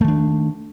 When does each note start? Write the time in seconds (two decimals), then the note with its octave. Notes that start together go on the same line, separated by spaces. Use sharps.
0.01 A3
0.04 D#3
0.08 D4